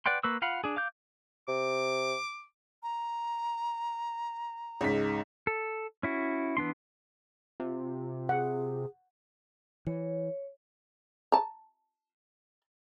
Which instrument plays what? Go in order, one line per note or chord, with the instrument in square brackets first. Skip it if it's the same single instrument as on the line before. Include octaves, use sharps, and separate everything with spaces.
[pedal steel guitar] B4 D5 F#5 G5 C6
A#3 B4 C#6 E6
F4 F5 F#5 B5
D4 G#4
F5 D6 G6
[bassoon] C3 [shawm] D6
[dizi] A#5
[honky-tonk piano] C#2 G#2 B6
[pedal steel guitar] A4
C#4 E4 F#4
E3 B3 D4 C6
[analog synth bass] C3 [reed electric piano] F4
[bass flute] G#4 [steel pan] F#5
[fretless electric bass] E3 [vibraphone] C#5
[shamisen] A5 A#5